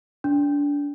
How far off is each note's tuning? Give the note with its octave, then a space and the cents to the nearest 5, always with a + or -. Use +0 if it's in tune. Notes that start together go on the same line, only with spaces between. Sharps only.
D4 -30